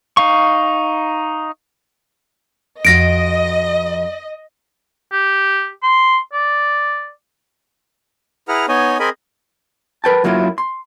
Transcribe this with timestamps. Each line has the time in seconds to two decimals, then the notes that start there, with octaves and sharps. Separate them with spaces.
0.17 D#4 F5 C#6
2.85 F2 F#4 D#5 A#6 D7
5.12 G4
5.83 C6
6.33 D5
8.48 E4 G#4 B4 F#5 A#5 F6
8.68 B3 D#4 C#5 D#5 G#5
9.00 C4 G#4 A#4 D#5 G#5 B5
10.04 A#4 B4 G5 A5
10.24 F#2 F#3 A#3 E4 F4
10.58 C6